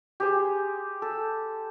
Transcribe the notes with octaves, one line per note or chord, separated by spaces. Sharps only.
G4 G#4 C5
A4